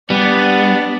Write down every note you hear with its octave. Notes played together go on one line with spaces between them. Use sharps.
G3 B3 D4